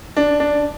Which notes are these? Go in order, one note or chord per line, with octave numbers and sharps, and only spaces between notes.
D4
D4